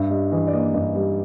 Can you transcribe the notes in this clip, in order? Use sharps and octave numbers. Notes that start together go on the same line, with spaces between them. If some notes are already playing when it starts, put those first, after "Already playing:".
Already playing: G2 E5
G3 D#5
E3 D#5
D5
A#3 D#5
G2 D#5
G3